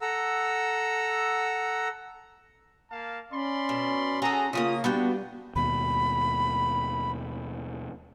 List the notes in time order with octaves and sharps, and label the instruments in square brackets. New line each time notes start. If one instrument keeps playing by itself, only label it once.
[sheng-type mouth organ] A4 F#5 A#5 E6
[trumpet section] A#3 F5 A5
[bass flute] C#4 [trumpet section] D5 B5 C6
[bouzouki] B2
[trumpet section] F#4 A#5 [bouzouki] G#4 A4
[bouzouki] C#3 G#3 A#3 [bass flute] F4 [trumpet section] D#6
[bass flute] G3 [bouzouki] B3 F#4 G5 [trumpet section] D4
[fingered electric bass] D#2 B2 [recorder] B5